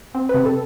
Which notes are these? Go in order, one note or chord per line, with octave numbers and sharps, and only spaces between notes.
C4
C3 B4
A4